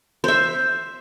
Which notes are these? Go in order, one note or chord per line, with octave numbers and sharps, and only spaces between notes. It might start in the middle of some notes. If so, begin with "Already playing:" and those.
C5 E5